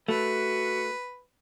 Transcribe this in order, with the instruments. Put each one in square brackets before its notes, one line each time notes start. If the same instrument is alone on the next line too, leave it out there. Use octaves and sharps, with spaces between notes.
[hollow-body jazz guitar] A3 [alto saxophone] F#4 [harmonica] B4